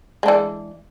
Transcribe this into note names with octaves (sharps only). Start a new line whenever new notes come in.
E3 G#3 D4